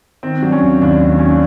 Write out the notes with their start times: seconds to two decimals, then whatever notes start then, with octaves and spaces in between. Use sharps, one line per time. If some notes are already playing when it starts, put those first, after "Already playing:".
0.23 D#3 C4
0.42 F#3 D4
0.52 C#4
0.62 D#2
0.81 D#2 D4
1.02 D#3
1.19 F#3 C#4
1.29 D4